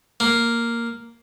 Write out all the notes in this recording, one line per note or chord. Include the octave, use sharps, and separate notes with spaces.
A#3